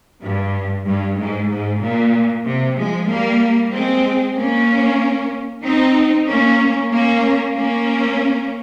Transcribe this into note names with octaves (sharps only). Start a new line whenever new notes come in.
G2
G2
G#2
G#2
A#2
C3
F3 G#3
G3 A#3
G#3 C4
A#3 C#4
C4 D#4
A#3 C#4
A#3 C#4
A#3 C#4